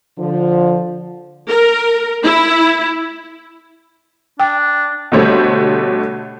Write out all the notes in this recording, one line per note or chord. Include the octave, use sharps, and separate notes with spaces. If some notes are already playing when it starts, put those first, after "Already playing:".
D3 F3
A#4
E4
D4 G5
B2 D3 G3 A3 C5 C#5